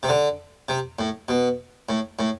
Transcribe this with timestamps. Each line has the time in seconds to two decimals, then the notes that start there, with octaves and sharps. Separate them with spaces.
0.03 C3
0.09 D3
0.69 C3
0.99 A2
1.29 B2
1.89 A2
2.19 A2